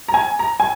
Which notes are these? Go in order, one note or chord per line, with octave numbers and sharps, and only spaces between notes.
A#5
G#5
A#5
G#5